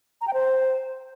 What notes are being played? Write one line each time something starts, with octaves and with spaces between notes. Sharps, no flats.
A#5
G5
C5